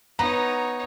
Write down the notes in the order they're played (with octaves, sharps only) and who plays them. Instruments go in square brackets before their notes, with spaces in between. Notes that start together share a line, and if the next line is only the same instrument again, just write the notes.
[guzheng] B3 [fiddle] D#4 C#5 [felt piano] A#5